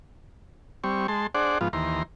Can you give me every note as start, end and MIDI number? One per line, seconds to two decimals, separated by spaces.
0.84 1.07 55
0.84 1.07 60
0.84 1.07 85
1.08 1.27 56
1.08 1.27 81
1.08 1.27 84
1.35 1.58 62
1.35 1.58 68
1.35 1.58 72
1.35 1.58 74
1.35 1.58 78
1.61 1.68 44
1.61 1.68 53
1.61 1.68 59
1.61 1.68 65
1.73 2.03 39
1.73 2.03 52
1.73 2.03 82
1.73 2.03 84